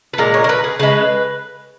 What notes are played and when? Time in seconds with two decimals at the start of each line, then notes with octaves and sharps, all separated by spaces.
0.13 B4
0.18 A#2 G#3 A#4
0.34 C#5
0.44 A#4
0.49 B4
0.64 G#4
0.79 C#3 G#3 B4